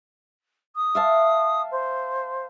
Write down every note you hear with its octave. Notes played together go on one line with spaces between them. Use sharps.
D#6
E5 F5 A5
C5